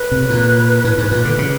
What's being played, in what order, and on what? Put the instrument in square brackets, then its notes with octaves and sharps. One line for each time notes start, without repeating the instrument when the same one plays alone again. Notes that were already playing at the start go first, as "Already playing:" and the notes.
Already playing: [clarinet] B4
[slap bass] C3
A#2
A2
G#2
A#2
D3
C#3